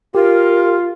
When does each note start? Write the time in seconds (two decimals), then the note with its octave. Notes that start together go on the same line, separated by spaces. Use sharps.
0.15 F4 G4 A#4